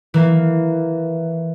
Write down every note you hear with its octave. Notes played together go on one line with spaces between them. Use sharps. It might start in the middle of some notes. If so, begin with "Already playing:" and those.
E3 A#3